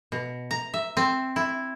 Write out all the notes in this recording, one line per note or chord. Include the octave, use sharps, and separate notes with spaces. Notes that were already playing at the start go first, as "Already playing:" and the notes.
B2
A#5
E5
C4
E4